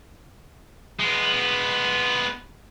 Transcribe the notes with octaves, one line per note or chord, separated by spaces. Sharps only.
G#3 B3